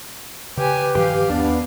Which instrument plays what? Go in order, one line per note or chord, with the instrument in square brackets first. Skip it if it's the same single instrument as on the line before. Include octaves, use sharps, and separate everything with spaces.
[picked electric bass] C#3 [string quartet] G4 G#5 [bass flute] B4
[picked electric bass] G2 D#3 F3 [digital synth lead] G4 [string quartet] F5
[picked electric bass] D#2 [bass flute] B3 [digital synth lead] D4